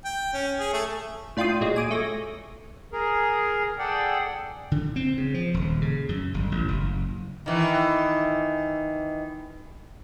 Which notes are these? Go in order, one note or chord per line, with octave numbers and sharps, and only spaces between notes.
G5
C#4
G#4
A3
A2 D4 F4 G5 C6 D#6
A#2 F#3 G#3
G#5 D6 D#6
A3 C#5 A#6
G#4 A#4
G#4 A4 D5 F#5 G5
D3
C4
C#3
F3
D#1
C#3
F#2
G1
A1
F#1
D#3 E3